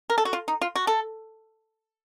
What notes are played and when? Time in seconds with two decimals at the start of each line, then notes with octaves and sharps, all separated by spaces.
0.10 A#4
0.18 A4
0.25 F#4
0.33 F4
0.48 D#4
0.61 F4
0.76 F#4
0.87 A4